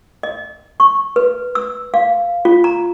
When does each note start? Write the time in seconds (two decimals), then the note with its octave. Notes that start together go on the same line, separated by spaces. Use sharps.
0.23 D#5
0.80 C#6
1.16 B4
1.55 E6
1.94 F5
2.45 F4
2.64 A#5